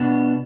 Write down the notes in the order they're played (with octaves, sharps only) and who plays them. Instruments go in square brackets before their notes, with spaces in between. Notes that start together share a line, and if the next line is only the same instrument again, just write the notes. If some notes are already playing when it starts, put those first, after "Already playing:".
Already playing: [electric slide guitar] B2 B3 D4